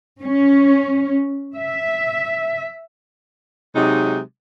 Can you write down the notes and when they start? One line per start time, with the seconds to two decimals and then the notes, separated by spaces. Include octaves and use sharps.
0.22 C#4
1.53 E5
3.75 C3 F#3 G#3 D#4